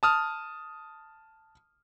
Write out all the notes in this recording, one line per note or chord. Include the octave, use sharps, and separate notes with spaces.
A5 D#6 F6